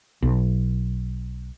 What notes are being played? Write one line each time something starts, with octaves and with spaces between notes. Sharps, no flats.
B1